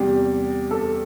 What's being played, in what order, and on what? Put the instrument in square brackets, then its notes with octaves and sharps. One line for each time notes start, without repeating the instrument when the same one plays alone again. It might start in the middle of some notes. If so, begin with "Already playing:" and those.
Already playing: [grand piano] E2 C3 G3 [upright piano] G4
[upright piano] A4